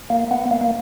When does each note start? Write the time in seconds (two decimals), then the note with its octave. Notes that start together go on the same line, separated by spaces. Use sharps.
0.10 A#3
0.31 B3
0.51 A#3
0.61 A#3